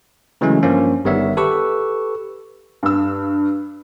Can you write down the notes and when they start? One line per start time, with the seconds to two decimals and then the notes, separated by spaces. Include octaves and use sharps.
0.41 C#3 E3 F#3 G#3 A3 C#4
0.63 G2 F3 A#3 C#4
1.05 G1 D#3 G3 B3 C#5 E5
1.37 G4 A4 B4 C#6 E6
2.83 G2 E6